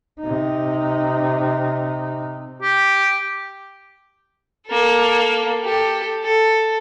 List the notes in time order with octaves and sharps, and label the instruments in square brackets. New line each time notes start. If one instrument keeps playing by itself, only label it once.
[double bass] C3 D#4
[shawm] G4
[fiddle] A#3 A4
G4 A4
A4